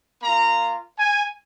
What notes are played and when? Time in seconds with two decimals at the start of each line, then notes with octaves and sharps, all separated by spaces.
0.23 A#3 F4 A#5
0.99 G#5